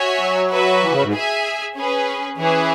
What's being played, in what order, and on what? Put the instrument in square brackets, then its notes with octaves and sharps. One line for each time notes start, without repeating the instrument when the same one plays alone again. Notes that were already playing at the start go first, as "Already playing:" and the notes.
Already playing: [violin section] F#4 C#5 E5 G#5
[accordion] F#3
[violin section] F#4 B4 E5
[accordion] E3
C#3
G#2
[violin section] G#4 E5 G#5
C#4 G#4 B4
[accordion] E3 [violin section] C#4 E4 G#4 C#5